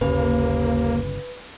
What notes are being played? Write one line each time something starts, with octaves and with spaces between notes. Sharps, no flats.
G1 D#2 C#3 A#3 B4